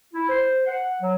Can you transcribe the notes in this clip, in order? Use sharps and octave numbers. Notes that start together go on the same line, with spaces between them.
E4
C5
F#5
F#3